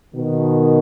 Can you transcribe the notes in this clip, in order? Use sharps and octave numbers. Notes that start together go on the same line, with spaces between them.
B2 D#3